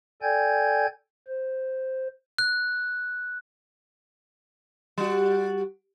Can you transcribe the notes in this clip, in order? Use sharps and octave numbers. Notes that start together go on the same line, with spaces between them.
A4 D5 G5 G#5 G6 G#6
C5
F#6
G3 F#4